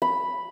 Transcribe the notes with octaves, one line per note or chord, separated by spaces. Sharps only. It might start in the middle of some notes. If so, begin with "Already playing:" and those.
B5